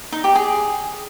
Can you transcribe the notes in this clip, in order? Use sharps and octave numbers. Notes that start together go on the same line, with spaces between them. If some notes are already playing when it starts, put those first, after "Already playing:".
D#4
G4
G#4